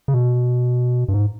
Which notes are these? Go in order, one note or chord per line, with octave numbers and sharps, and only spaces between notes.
C#3
B2
G2
G#2